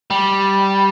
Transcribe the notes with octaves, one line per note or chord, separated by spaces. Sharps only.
G3